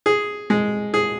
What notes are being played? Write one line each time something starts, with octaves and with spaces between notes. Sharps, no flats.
G#4
G#3
G#4